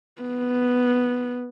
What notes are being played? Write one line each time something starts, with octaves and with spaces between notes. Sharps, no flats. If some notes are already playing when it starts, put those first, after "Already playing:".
B3